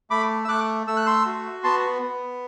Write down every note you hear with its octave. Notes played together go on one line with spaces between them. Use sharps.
A3 B5 D6
E6
A3 D6 F#6
A3 E6
F#6
C6 E6
F#4
B3 A5 C6
B3